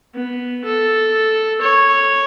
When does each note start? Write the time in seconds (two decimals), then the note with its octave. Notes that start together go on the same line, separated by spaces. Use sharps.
0.15 B3
0.64 A4
1.62 C#5